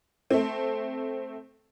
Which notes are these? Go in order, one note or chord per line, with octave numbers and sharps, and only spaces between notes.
A3 C4